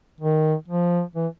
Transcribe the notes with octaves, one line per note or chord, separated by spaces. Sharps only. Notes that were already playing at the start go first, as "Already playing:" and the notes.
D#3
F3
E3